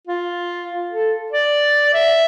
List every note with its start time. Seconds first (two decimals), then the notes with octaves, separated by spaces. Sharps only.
0.07 F4
0.91 A4
1.32 D5
1.94 E5